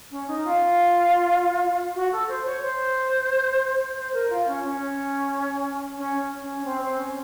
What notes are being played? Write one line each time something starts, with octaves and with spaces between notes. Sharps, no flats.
C#4
D#4
F4
F#4
A4
C5
C#5
C5
C5
A#4
F4
C#4
C#4
C#4
C#4
C4
C4
C#4